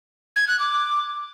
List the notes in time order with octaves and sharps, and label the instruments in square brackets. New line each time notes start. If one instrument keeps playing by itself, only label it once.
[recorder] G#6
F#6
D6